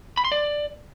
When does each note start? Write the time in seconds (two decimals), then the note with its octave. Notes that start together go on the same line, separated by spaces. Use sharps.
0.17 B5
0.25 C6
0.32 D5